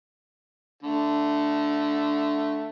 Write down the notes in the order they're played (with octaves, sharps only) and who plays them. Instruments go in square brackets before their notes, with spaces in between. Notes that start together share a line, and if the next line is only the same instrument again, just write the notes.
[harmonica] D3 A3